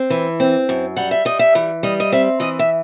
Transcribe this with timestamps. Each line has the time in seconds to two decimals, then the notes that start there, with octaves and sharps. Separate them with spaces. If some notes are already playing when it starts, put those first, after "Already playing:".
Already playing: C4
0.10 E3
0.40 C4
0.69 F#2
0.96 G3 F#5
1.11 E5
1.25 G3 D#5
1.39 E5
1.55 E3
1.83 G3 D#5
2.00 D#5
2.12 C4 E5
2.40 E3 D#5
2.59 E5